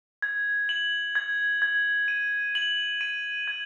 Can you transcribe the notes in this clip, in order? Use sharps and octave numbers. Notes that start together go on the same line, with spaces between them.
G#6
F#7
G#6
G#6
D#7
F#7
D#7
G#6